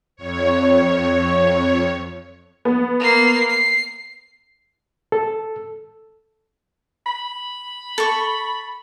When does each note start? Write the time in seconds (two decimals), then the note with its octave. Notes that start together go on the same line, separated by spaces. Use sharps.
0.16 F2 C#5
2.65 B3
3.00 A#3 C7
3.49 C7
5.12 A4
7.06 B5
7.98 A4 C#6